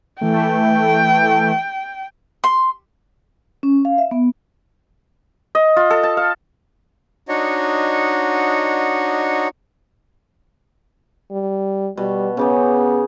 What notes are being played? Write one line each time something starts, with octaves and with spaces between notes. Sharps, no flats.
E3 A3 G5
C6
C#4
F5
E5
B3
D#5
F4
A4
A5
F5
D4 D#4 F#4 C#5 D#5 F#5
G3
B2 G3
C#3 B3 G4 G#4